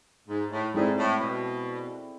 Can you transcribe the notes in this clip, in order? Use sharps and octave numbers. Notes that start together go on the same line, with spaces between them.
G#2
A2
G#2 G#3 C4 E4 A4 D5
A2
B2